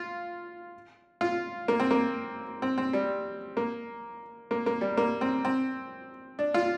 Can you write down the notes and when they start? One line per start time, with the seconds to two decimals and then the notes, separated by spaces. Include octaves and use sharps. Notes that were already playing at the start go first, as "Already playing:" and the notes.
Already playing: F4
1.21 F4
1.68 A#3
1.80 C4
1.91 A#3
2.62 C4
2.78 C4
2.93 G3
3.57 A#3
4.51 A#3
4.66 A#3
4.81 G3
4.97 A#3
5.21 C4
5.45 C4
6.39 D4
6.54 F4